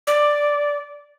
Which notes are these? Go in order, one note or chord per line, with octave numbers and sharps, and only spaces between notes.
D5